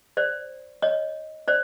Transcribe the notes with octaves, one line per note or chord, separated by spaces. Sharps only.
C5 D5
C#5 D#5
C5 D5